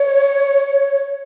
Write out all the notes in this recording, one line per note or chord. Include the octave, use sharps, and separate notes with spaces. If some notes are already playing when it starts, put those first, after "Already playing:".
Already playing: C#5